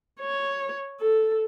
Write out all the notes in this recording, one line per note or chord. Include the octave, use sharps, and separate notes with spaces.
C#5
A4